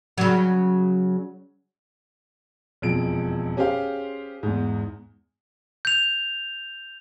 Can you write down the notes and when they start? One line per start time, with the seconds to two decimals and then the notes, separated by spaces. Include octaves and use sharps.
0.18 C#3 F#3
2.82 E1 F2 G#3 D7
3.57 C#4 G4 G#4 C5 F5
4.43 E2 G#2
5.85 G6 F7